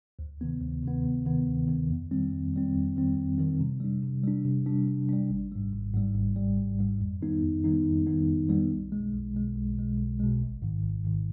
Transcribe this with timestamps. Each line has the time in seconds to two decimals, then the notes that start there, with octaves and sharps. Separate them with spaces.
0.19 D2
0.41 C3 D#3 B3
0.62 D2
0.83 C3 D#3 B3
1.05 D2
1.26 C3 D#3 B3
1.47 D2
1.68 C3 D#3 B3
1.90 F2
2.11 D#3 G3 C4
2.32 F2
2.53 D#3 G3 C4
2.74 F2
2.96 D#3 G3 C4
3.17 F2
3.38 D#3 G3 C4
3.60 C3
3.80 G3 D4
4.02 C3
4.24 G3 D4
4.45 C3
4.66 G3 D4
4.87 C3
5.09 G3 D4
5.30 G#1
5.52 G#2 G3
5.73 G#1
5.94 G#2 G3
6.16 G#1
6.36 G#2 G3
6.58 G#1
6.79 G#2 G3
7.00 F2
7.21 D#3 G3 B3 D#4
7.43 F2
7.64 D#3 G3 B3 D#4
7.86 F2
8.07 D#3 G3 B3 D#4
8.27 F2
8.49 D#3 G3 B3 D#4
8.71 B1
8.92 B2 G#3
9.13 B1
9.35 B2 G#3
9.55 B1
9.77 B2 G#3
9.98 B1
10.20 B2 G#3
10.41 G#1
10.62 G#2 D#3
10.84 G#1
11.05 G#2 D#3